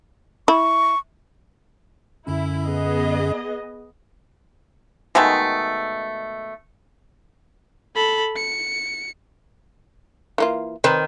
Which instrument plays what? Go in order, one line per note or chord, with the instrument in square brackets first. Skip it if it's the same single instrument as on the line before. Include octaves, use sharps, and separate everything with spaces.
[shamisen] E4 [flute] C#6
[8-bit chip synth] F#2 D3 C#4 [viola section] E4
[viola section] B3 G#4 D#5
[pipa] B2 D#3 G#3 A3
[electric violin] A4 B5
C#7
[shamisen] E3 A#3 F4
[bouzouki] D#3 [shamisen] C4 B4